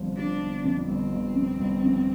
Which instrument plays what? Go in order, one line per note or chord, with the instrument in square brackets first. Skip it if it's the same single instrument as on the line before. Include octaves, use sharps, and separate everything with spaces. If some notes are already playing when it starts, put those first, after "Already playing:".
Already playing: [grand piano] G1 F2 F3
[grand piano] F3 [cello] D4
[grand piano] G1
F2
[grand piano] G1 [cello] C4
[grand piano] G1
F2
G1
F2